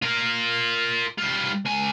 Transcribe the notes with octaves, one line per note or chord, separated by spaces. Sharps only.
F4 A#4
G3 F4
C#2 G#5